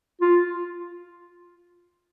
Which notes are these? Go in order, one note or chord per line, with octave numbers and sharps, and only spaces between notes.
F4